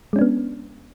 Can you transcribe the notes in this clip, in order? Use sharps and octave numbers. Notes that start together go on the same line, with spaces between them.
G#3 B3 C#4 D4